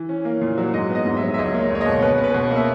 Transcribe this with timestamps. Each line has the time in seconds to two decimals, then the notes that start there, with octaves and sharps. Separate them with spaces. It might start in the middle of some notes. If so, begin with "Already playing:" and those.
Already playing: E3
0.09 C#4
0.25 A#3
0.41 A#2
0.58 F#3
0.74 G#2 D#5
0.90 B3
0.95 D#5
1.06 G#2
1.17 E5
1.22 F#3
1.34 E5
1.38 C#2 D#5
1.54 A#3
1.60 C#5
1.70 C#2 C#5
1.81 D#5
1.86 B2
2.02 B2 B4
2.18 C#4
2.24 B4
2.34 B2
2.51 A#3
2.56 E5